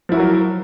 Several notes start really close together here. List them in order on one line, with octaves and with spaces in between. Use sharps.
F3 E4 F#4 A#4 F#3